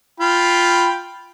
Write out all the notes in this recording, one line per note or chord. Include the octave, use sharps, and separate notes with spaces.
F4 G5 B5